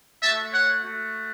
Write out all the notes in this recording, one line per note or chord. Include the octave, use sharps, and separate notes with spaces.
A3 F#4 E5 A5
C#5 F#5
A3 F#4